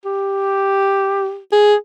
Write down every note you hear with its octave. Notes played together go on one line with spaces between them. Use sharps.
G4
G#4